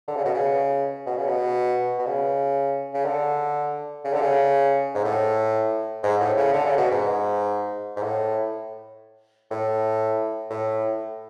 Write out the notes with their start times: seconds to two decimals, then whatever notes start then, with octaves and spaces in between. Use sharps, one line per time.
0.08 D3
0.16 C#3
0.25 B2
0.34 C#3
1.06 B2
1.17 C#3
1.27 B2
1.99 B2
2.07 C#3
2.94 C#3
3.05 D3
4.04 C#3
4.14 D3
4.21 C#3
4.95 G#2
5.04 A2
6.03 G#2
6.20 A2
6.37 C#3
6.53 D3
6.65 C#3
6.77 B2
6.91 G#2
7.96 G#2
8.03 A2
9.51 A2
10.50 A2